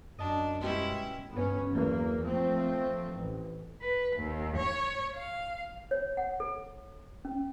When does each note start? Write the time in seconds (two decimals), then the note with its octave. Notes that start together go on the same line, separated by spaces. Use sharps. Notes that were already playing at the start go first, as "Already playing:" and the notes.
0.19 F#2 D4 D#5 A5
0.61 B2 G3 G#3 C#4 E4 G4
1.30 G1 B3 C#4
1.70 E2 F#3 A#3
2.24 F3 A3 C4
3.14 A1
3.82 B4
4.16 D#2
4.56 C#5
5.15 F5
5.91 C#5
6.17 F#5
6.40 A4
7.25 C#4